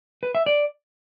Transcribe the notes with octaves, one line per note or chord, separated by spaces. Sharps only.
B4
E5
D5